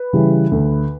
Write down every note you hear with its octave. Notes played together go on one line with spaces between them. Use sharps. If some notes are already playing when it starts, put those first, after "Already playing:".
Already playing: B4
C#3 E3 G3
D2